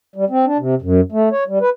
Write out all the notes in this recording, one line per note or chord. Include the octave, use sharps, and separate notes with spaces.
G3
C4
D4
C3
F#2
A3
C#5
G3
B4